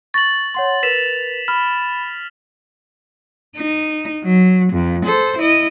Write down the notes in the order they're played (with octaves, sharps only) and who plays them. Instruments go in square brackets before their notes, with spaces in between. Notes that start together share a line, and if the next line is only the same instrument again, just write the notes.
[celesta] C#6 A#6 [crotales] A6 F#7
[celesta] C#5 F#5 C6
[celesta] A#4 B4 [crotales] B6 E7 F7
[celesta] B5 [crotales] F6
[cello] D#4
F#3
F2
A4 C5
E4 D#5